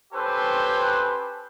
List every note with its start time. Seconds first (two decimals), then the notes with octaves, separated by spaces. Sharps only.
0.13 C#4 G4 A4 B4 C5 G5